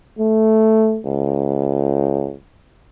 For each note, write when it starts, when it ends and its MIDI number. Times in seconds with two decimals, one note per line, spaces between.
0.19 1.00 57
1.05 2.35 37